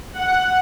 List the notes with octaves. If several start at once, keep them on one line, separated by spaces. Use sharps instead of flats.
F#5